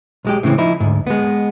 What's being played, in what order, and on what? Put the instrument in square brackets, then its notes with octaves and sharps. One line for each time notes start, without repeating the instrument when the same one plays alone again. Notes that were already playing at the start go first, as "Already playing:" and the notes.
[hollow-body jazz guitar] B1 G#3 G4
A2 C#3 E3 C4
F3 D#4 E4
D2 G#2
G#3 B3